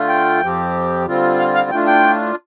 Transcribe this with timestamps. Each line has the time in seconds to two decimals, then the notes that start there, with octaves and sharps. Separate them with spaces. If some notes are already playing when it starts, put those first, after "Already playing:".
Already playing: D3 A3 F4
0.08 G5
0.42 F2 F3 C4 G4
1.06 D3 G3 C4 F4
1.39 F5
1.55 F5
1.70 A2 A3 D4 F4 G5
1.87 G5